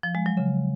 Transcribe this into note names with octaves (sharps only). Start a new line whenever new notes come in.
F3
G#3
F#3
C#3